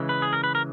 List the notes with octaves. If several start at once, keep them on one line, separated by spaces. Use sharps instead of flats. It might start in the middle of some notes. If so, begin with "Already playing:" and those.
Already playing: C#3 E3 G#3
B4
G#4
A#4
B4
A#4